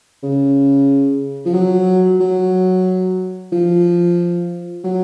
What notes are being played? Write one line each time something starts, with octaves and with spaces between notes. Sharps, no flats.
C#3
F3
F#3
F#3
F3
F#3